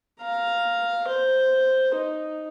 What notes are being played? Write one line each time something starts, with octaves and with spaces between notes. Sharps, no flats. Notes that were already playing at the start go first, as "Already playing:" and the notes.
F5 A#5
C5
D#4